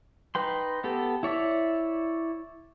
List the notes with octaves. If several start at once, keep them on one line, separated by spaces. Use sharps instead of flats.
D#4 B4 G5 C6
B3 G4 A4
E4 C#5 D5 E5